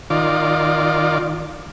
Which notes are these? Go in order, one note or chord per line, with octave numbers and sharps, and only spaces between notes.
D#3 F4 D5